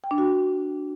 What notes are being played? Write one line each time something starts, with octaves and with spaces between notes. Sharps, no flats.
G5
D4
F#4